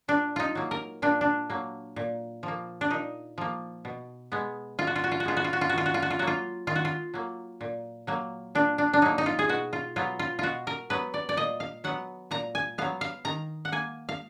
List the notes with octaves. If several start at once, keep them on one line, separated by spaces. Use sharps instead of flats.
A#2 D4
D#4 F4
F#3 A#3
A#4
A#2 D4
D4
F#3 A#3
A#2
F3
A#3
D4
A#2 D#4
F3 A#3
B2
G#3 B3
B2 F4
F#4
F4
F#4
F4
F#4
G#3 B3 F4
F#4
F4
F#4
F4
D#3 F#4
F4
F#4
F4
F#4
F4
F#3 A#3 F#4
F4
D#3 F4
F#4
F4
F#3 A#3
A#2
F#3 A#3
A#2 D4
D4
D4
F#3 A#3 D#4
D#4
F4
G#4
B2 F#4
F4
F#3 B3 F4
F4
B2 F4 F#4
A#4
F#3 B3 B4
D5
D5
A#2 D#5
F5
F#3 B3 F#5
A#2 A#5
G#5
F#3 B3 F5
F5
D#3 A#5
F#5
A#3 G#5
F5